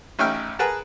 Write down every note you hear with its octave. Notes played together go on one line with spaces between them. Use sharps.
A1 C#4 D#4 E5 G5 F6
G#4 A#4 B4 F#5 A5